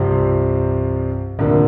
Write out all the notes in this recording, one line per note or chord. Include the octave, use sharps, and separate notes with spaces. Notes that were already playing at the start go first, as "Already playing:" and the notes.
Already playing: C2 G2 C3 F3 C4 G4
D2 A2 C3 F3 A#3 D4